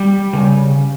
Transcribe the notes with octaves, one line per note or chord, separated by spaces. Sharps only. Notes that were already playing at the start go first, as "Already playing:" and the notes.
Already playing: G3
C#3